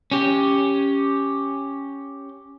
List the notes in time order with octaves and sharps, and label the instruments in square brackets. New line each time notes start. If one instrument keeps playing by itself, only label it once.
[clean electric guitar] C#4 G4